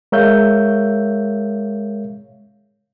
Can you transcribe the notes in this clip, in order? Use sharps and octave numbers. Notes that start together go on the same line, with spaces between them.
G#3 A#4 C#5 E5 F5 G6